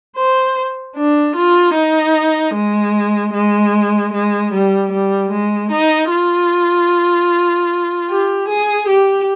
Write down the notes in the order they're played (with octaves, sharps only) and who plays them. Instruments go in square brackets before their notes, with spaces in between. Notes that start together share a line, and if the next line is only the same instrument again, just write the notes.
[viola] C5
D4
F4
D#4
G#3
G#3
G#3
G3
G3
G#3
D#4
F4
G4
G#4
G4